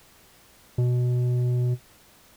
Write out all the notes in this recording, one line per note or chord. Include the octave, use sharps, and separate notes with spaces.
B2